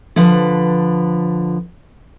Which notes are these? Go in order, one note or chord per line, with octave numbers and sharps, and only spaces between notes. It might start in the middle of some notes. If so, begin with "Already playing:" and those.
D3 F3 B4